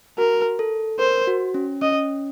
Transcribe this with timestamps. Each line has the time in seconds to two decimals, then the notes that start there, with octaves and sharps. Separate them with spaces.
0.18 F#4 A#4
0.59 A4
0.99 A#4 C5
1.27 F#4
1.54 C#4
1.81 C#4 D#5